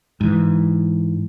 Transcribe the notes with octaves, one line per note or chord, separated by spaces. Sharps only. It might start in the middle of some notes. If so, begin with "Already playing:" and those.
G#2 E3